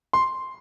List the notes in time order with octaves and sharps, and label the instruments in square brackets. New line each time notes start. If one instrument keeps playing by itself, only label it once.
[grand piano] C6